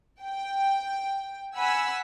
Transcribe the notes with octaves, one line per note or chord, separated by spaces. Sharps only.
G5
F#5 G#5 B5 E6